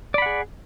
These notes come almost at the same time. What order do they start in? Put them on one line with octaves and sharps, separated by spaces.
D5 B5 F#5 G#4